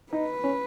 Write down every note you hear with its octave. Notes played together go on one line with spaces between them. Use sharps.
D#4 B4
C#4